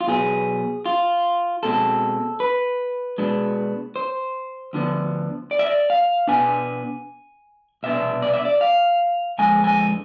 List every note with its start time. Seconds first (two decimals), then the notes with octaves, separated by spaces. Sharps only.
0.01 F4
0.07 B1 B2 B3 G#4
0.86 F4
1.63 B2 G#3 C4 A4
2.40 B4
3.18 B2 G#3 B3 D4
3.96 C5
4.73 D2 D3 F3 B3 D4
5.51 D5
5.59 E5
5.66 D5
5.90 F5
6.27 B2 B3 D4 G#5
7.83 C2 B2 B3 D4 E5
8.22 D5
8.34 E5
8.45 D5
8.61 F5
9.38 F2 D3 G#3 G#5
9.64 G#5